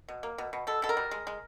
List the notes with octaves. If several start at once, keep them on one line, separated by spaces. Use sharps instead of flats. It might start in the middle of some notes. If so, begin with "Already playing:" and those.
B2
A#3
B2
B2
B2 A4
B2 A4
A#4
G3
G#3
G#3